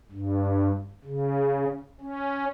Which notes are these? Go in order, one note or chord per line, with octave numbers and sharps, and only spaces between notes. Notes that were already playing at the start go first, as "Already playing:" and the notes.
G2
C#3
C#4